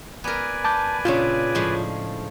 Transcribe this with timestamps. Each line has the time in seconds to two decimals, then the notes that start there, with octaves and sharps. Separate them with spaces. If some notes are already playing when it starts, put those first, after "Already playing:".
0.24 B3 A#4 B4 D5 G#5
0.64 A5 D6 G6
1.05 A#2 C#3 D4 F4 C#5
1.55 A2 F3 G#3